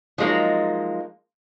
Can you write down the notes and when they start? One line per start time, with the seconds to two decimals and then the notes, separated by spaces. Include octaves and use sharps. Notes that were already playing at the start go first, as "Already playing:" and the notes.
0.18 F3 F#3 G#3 A#3 D#4